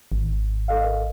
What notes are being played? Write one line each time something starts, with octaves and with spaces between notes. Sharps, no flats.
G#1
A4 D#5 F5
A#4